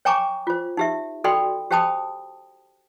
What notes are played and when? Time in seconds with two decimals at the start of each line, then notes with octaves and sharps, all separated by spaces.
0.05 C#5 G5 G#5 A#5 C#6 D6
0.47 F4 C5
0.77 D#4 G4 E5
1.24 F#4 A4 D5 G5 B5 C6
1.71 G4 C5 G5 A5 B5 D#6